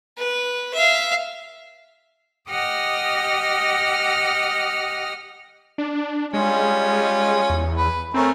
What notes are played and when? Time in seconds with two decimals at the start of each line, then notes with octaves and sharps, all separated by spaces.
0.18 B4
0.74 E5 F5
2.50 G4 D#5 F#5 D#6 F6 A#6
5.78 D4
6.33 G3 G#3 C#4 F4
7.50 E2
7.77 B4
8.14 A3 C4 C#4 A#4